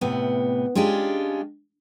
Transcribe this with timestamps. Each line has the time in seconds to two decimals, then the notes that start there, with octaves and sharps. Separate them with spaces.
0.01 A2 C3 B3
0.75 G#3 C#4 D4 F4 G4